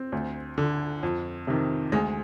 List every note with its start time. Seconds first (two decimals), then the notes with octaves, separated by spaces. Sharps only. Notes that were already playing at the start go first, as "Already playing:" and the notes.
Already playing: C4
0.12 D2
0.58 D3
1.03 F2
1.47 C3 D#3
1.92 D2 G#3